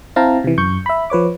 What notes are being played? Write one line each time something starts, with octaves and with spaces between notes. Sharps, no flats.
C4 E4 F5 G5 A5 A#5
C3 E3
F#2 C#6 G6
E5 B5
F3 B4 C#5 D6